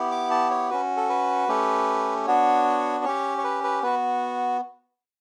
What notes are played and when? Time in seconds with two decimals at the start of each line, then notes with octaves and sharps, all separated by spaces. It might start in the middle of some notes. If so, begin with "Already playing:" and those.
Already playing: B3 E4 G4
0.11 D6
0.31 A5
0.51 C#5
0.70 C#4 F#4 B4
0.97 A4
1.09 B4
1.48 A3 C#4 G4
2.27 B3 D4 F#4 C#5
3.04 C#4 G4 C#5
3.38 C#5
3.44 B4
3.64 B4
3.83 B3 F#4 B4